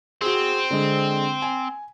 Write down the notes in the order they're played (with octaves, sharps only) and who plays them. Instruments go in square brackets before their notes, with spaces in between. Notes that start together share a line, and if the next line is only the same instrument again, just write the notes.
[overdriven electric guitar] C4 [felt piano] F#4 G#4
[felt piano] D3 G#3
G#5